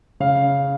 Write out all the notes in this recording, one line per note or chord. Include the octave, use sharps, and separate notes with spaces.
C#3 F5